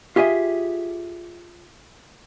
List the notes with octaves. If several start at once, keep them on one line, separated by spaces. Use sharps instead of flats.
F4 G4 G#4 D#5 E5